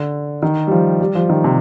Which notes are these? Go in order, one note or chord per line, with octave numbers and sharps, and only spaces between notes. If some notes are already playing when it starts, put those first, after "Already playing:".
Already playing: D3
D#3
G3
F3
G3
F3
D#3
C3